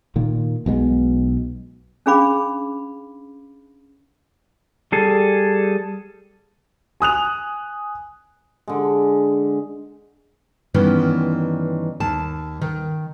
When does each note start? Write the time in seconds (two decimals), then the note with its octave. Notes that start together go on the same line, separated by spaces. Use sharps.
0.16 A#2 D#3 A#3
0.66 B1 B2 G#3 B3
2.06 C#4 D4 G#4 F5 B5 D6
4.92 G3 G#4 A4
7.00 G#5 D#6 F#6 F7
8.68 D3 G#3
10.74 G2 D#3 E3 B3 C#4
12.00 D#2 A5
12.61 D#3